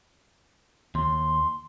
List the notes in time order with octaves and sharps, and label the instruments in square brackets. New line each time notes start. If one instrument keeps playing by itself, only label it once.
[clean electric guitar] D#2 [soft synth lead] C6